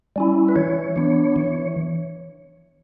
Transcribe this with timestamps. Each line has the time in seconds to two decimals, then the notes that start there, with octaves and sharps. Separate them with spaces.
0.16 G3 C#4 E4
0.49 B4
0.56 E3 C#5
0.96 B3 D4
1.36 E3